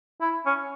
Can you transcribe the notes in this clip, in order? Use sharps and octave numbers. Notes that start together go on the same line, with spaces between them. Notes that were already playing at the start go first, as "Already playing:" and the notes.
E4
C#4